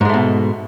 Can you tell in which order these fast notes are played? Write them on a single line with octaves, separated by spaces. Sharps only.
G#2 G#3 A3 B2